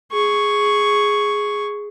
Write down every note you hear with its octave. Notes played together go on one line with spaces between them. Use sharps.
G#4 C#6